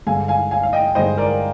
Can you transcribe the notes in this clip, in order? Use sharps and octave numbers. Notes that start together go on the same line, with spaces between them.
G2 D3 G#3 F5 G#5
F5 G#5
F5 G#5
F5
D#5 G5
G2 D3 G#3 C5 D#5
A#4 D5